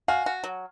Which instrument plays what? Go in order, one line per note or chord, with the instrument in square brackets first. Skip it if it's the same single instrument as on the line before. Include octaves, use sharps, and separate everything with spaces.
[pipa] F#4 [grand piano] F5 G#5
[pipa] F#4
F#3